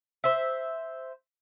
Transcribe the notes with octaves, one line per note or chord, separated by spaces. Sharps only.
C5 E5